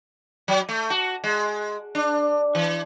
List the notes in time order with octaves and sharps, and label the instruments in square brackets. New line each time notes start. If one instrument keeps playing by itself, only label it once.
[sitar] F#3
A3
F#4
G#3
D4
E3